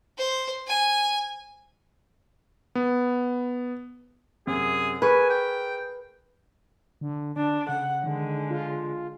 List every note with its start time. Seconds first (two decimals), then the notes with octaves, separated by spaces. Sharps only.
0.18 C5
0.68 G#5
2.75 B3
4.47 F#2 C3 G#4
5.02 G#4 A#4 B4 G#5 C#6
5.30 G5
7.01 D3
7.36 D3 D4
7.69 C#3 F#5
8.04 D3 D#3 G#3
8.50 F4